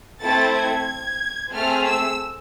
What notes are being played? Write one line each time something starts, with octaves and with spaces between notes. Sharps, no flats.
A3 C4 E4 A4 A6
G#6
A3 C4 G#4 F6
E6